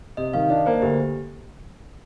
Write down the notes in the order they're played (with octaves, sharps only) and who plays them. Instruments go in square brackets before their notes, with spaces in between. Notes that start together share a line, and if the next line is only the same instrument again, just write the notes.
[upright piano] C3 [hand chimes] D#5
[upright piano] D#3 [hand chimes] F5
[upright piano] D4 [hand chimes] D#5
[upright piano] A#3 [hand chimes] C5
[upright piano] D2 [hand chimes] G4